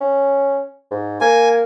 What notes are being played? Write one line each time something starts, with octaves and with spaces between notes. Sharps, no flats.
C#4
G#2
A#3 G#5